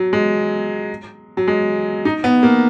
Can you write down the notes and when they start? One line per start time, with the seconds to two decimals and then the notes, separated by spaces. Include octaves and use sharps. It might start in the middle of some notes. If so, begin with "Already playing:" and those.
Already playing: F#3
0.13 G#3
1.37 F#3
1.48 G#3
2.05 D#4
2.24 B3
2.43 A#3